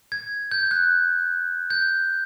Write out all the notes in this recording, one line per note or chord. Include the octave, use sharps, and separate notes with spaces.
G#6
G6
F#6
G6